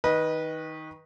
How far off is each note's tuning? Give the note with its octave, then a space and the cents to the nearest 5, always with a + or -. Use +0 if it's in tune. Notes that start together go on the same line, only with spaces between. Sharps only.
D#3 +15 B4 -20 D#5 +0